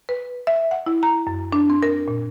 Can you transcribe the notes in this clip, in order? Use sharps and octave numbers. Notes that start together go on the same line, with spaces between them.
B4
E5
F#5
E4
A#5
F#2
D4
C4
A#4
A#2